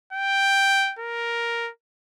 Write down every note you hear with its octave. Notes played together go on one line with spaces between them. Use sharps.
G5
A#4